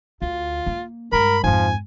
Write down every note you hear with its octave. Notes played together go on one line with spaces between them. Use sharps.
D2 F4
A#3
G2 G#3 A#4 B5
F2 G#2 F3 G#5